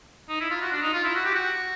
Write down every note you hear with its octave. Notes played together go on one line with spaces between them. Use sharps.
D#4
E4
F4
F#4
D4
D#4
F4
E4
F#4
G4
F#4